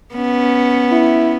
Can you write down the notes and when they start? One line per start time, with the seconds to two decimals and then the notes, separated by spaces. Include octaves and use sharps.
0.14 B3 C#4
0.91 E4